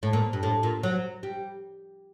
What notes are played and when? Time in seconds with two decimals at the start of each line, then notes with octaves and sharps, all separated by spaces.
0.03 A2
0.13 A#2
0.33 G2
0.43 A2
0.63 A#2
0.83 F#3
1.23 G3